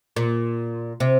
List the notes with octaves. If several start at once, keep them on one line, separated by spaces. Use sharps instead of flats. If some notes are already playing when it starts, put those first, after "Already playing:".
A#2
C3